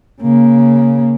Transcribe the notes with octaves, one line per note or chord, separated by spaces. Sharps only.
C#3 A#3